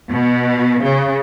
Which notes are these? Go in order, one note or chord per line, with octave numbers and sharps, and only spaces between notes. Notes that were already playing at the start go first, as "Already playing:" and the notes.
B2
C#3